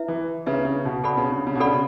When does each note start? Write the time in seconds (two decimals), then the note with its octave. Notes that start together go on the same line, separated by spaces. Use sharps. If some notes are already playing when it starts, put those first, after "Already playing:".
Already playing: E4 B4 E5
0.08 E3
0.46 C#3 E4 B4 E5
0.65 C#3
0.85 B2
1.03 B2 A4 D5 F#5 B5
1.18 C#3
1.32 C#3
1.47 C#3
1.55 B2
1.60 C#3 A4 D5 F#5 B5